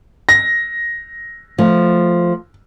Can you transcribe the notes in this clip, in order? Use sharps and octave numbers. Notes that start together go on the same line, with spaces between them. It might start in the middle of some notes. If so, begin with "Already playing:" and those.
A#6
F3 A3